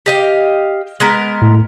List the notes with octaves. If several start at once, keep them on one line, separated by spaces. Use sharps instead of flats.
G4 D#5 F5
G#3 B3 A#4
A2